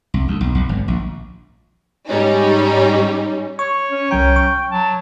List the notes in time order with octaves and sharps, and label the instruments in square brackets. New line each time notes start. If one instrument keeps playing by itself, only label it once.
[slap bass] C2
D2
B1
B1
G#1
A#1
[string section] G#2 G3 C#4 D#4
[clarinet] C#5 [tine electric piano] C#6
[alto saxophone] C#4
[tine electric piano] C2 F#3 A#5 [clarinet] G5
[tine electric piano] C#6
[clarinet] F#3 [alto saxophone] A5